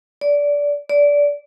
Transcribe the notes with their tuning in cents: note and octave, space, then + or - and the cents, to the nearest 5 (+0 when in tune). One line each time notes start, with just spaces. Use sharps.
D5 -20
D5 -20